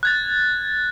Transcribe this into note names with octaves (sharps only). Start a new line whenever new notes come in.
F#6 G#6 A6